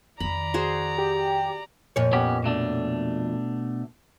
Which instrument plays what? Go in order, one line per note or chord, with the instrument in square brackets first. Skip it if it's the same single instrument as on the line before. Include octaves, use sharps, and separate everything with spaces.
[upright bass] F2 D#3 [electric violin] D5 A#5 [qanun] B5
[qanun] F#4 G#4 C5
[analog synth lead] G4
[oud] F2 A#2 C#5
[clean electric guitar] B3 C#4 G4
B2 A3 D4